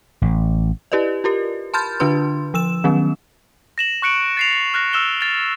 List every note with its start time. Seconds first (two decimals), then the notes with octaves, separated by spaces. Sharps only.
0.22 A1
0.92 E4 G4 B4 D5 D#5
1.24 F4 G4 A#4
1.74 A5 B5 C6 F6 G6 A6
2.00 D3 D4 F4 B4 C6
2.54 F3 E6 E7
2.84 D#3 F#3 B3 C#4
3.78 A#6 E7 F#7
4.02 C#6 F#6 C#7 D7 F#7
4.37 A6 C7 F7
4.74 F6 F#6 A#6
4.93 E6 F6 E7 G7
5.21 A6 F7